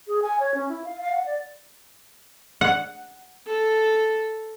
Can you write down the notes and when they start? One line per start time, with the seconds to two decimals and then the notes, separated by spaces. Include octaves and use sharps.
0.08 G#4
0.22 G#5
0.40 C#5
0.54 C#4
0.69 E4
0.85 F5
1.01 F5
1.12 F#5
1.26 D5
2.61 F#5
3.47 A4